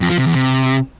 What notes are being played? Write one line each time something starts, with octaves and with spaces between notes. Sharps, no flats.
F2
F3
C3
E2
C3